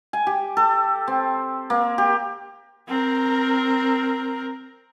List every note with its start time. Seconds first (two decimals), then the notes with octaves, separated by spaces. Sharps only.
0.13 G#5
0.27 G4
0.57 A4
1.08 C4
1.70 A#3
1.98 G4
2.88 C4 A#4